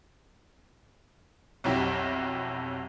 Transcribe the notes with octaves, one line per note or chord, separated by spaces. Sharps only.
B1 F2 F#3 E4 G4